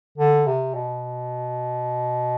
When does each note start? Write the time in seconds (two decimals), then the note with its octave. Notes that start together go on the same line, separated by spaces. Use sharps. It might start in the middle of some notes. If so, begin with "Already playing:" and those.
0.18 D3
0.46 C3
0.74 B2